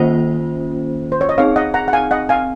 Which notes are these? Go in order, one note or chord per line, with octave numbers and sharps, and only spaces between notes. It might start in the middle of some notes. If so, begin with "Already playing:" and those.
Already playing: D#3 A#3 C#4 F4 C5 D#5 F#5
C5
C#5
D#5
C4 D#4 G#4 C#5 F5
D#5 F#5
F#5 A#5
F#5
F5 G#5
D#5 F#5
F5 G#5